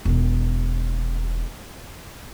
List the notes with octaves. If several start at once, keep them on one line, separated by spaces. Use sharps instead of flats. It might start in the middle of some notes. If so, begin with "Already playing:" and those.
E1 D#3